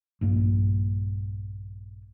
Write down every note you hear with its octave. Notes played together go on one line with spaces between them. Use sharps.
A#1 G2 A#3